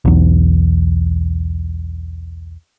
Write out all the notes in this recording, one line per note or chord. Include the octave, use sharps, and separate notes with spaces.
B1 E2